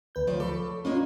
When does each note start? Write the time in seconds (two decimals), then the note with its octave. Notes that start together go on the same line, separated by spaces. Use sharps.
0.15 D2 B4 G6
0.27 F3 A3 C#5 D5
0.40 A4 B5 C#6 D6
0.85 A#3 C#4 D4 F4 C#5 D#5